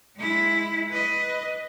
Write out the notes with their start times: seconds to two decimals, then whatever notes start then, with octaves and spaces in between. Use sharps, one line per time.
0.16 G#3 E4
0.90 B4 D#5